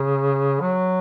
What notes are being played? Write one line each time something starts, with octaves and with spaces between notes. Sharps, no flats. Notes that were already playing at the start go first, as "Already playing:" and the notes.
Already playing: C#3
F#3